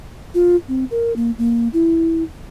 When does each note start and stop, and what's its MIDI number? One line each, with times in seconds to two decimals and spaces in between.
0.34 0.56 65
0.68 0.84 60
0.91 1.15 70
1.16 1.31 58
1.38 1.68 58
1.73 2.23 64